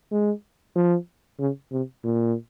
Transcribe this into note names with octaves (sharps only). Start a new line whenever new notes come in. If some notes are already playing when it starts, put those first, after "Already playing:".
G#3
F3
C#3
C3
A#2